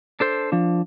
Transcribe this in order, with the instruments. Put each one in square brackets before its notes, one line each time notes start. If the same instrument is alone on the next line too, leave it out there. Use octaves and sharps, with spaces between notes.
[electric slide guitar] D4 A4 C5
F3 D4